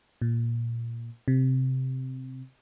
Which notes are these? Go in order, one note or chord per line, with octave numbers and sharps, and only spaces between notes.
A#2
C3